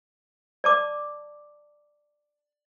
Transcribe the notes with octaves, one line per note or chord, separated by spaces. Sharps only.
D5 A5 D6